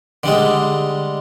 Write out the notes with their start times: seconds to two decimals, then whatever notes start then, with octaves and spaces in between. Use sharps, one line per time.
0.23 D3 G3 G#3